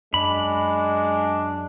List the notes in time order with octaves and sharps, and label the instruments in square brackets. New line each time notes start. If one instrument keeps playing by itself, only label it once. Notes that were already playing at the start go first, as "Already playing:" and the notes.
[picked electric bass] F#2 [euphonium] G#3 [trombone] D4 [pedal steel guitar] B5